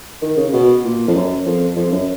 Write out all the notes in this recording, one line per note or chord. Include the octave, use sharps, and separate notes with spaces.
D#3
C#3
B2
A#2
F2
F#2
F2
F2
F#2